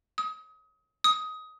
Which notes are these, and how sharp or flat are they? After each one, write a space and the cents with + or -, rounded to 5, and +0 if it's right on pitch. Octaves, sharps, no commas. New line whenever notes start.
D#6 +30
D#6 +15